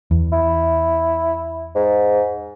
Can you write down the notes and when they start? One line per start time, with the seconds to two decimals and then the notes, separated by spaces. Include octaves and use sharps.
0.11 E2
0.33 E4
1.75 G#2